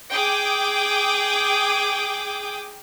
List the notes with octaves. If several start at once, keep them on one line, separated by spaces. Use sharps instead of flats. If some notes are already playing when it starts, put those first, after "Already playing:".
G#4 G5 D6 D#6